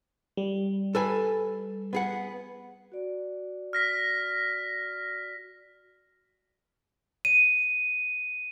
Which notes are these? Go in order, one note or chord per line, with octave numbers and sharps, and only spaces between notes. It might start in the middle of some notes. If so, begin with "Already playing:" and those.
G3
A4 B4 G#5
B3 G#4 F#5
F#4 D5
F6 A#6 B6
D#7